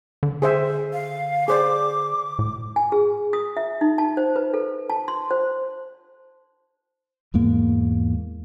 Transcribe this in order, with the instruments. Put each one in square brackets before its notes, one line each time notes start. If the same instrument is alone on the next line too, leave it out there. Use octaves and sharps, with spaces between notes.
[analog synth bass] D3
[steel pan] G#4 C5 E5
[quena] F5
[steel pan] G#4 C5 D5 [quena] D6
[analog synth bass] A2
[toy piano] G#5
G#4
D#6
E5
D#4
A5
C5
B4
A4
A5
C6
C5
[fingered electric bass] E2 G#2 A#3